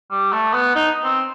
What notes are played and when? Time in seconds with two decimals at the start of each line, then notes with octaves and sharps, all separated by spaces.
0.11 G3
0.32 A3
0.54 B3
0.75 D#4
1.04 C4